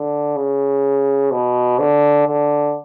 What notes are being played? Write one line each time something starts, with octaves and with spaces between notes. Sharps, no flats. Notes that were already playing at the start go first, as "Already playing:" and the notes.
Already playing: D3
C#3
B2
D3
D3